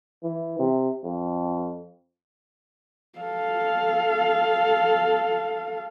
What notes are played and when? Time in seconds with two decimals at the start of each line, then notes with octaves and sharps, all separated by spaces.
0.23 E3
0.59 C3
1.04 F2
3.19 A4 F5